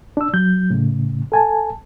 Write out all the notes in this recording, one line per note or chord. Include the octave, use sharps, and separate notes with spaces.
D4 E6
F#3 G6
A2 C#3
A4 G#5 A5